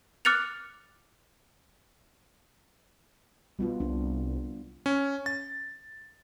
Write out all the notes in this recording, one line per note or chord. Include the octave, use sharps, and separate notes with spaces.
D6 F6 F#6 A6 C#7 F7
B2 G3 B3 F4
C2 D4
C#4
A6